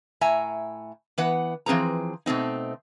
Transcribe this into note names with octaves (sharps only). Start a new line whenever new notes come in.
A2 E5 G#5 A#5
E3 B3 B4 F#5
E3 F3 C4 G#4 B4 A#5
B2 A3 C4 D#4